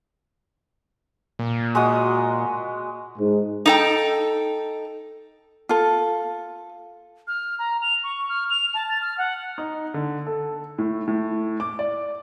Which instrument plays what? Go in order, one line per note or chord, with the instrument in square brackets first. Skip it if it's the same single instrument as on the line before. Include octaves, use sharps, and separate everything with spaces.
[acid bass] A#2
[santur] G#3 F#4 D#6
[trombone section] G#2
[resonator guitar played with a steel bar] D#4 A4 G5
[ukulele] F4 A4
[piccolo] F6
A#5
F7
C#6
F6
F7
A5
A6
F6
F#5
[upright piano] D#4
D3
A4
A2
A2
D6
D5